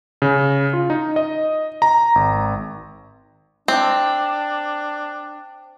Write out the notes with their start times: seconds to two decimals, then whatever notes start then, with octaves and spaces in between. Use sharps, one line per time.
0.22 C#3
0.73 F4
0.90 D#4
1.16 D#5
1.82 A#5
2.15 G#1
3.68 C4 D4